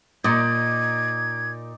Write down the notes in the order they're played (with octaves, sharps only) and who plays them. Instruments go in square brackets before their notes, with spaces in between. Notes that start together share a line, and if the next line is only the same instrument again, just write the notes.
[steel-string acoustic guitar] A#2 [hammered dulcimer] D#4 D5 [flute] G#6